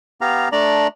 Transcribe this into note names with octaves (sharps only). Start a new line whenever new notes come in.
B3 G4 F5 A#5
A3 D4 D5 A#5